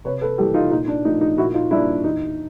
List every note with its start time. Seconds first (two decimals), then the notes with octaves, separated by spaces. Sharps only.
0.04 C3 B4 C#5
0.21 A4 B4
0.38 E3 G3 A#3 G4 A4
0.54 D#4 F4
0.71 A#2 D#4
0.88 D4
1.05 A3 D#4
1.09 F3
1.21 D#4
1.37 A#2 E4 F#4
1.54 D#4 F4
1.71 G3 A#3 D4 E4
2.04 E2 D#4